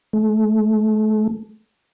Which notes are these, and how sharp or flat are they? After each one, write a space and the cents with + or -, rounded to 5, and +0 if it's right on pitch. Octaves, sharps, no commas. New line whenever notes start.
A3 -35